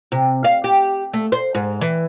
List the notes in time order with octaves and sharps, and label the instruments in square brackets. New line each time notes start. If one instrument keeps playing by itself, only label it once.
[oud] C3
F5
G4
A3
C5
G#2
E3